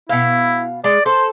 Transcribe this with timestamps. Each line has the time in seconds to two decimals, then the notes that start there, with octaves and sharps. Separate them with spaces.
0.09 B2 E4 F5
0.84 G#3 D5
1.06 A4 C5